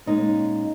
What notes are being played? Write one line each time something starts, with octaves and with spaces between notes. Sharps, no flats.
A#2 G#3 C#4 D#4